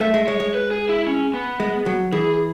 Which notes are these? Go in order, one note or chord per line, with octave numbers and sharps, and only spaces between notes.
A3 E5
G#3
G#3 C#5
G#3
B4
G#4
E4
C#4
B3
G#3
F#3
E3 G#4